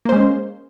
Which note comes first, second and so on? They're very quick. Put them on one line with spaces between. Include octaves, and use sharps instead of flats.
A#3 C5 G#3 C#4